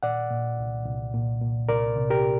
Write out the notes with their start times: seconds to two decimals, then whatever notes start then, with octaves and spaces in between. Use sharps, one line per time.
0.03 A#2 D5 F#5
0.31 A#2
0.59 C2
0.86 C2
1.13 A#2
1.42 A#2
1.69 C2 A#4 D5
1.96 C3
2.10 G4 A#4